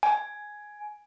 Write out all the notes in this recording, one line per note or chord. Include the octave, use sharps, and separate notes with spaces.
G#5